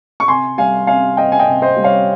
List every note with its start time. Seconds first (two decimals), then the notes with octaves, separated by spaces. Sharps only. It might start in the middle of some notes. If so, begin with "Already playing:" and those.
0.20 C#6
0.28 C3 G#5 C6
0.58 G3 F5 G#5
0.87 C3 F5 G#5
1.17 C4 D#5 G5
1.32 G#5
1.39 D#5 G5
1.47 C3
1.62 C5 D#5
1.77 G3
1.84 C#5 F5